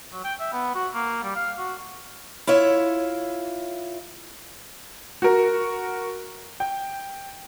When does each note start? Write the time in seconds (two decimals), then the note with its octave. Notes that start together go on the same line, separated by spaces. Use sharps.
0.12 F#3
0.24 G5
0.40 E5
0.52 B3
0.75 F#4
0.94 A#3
1.23 G3
1.35 F5
1.58 F#4
2.47 E4 F4 C#5 E5
5.22 F#4 A#4
6.60 G5